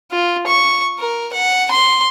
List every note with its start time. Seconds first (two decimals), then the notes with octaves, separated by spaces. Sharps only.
0.12 F4
0.47 C#6
0.99 A#4
1.33 F#5
1.71 C6